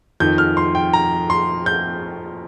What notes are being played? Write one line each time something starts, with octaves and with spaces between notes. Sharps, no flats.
F2 D#3 G6
F6
C6
G5
A#5
C6
G6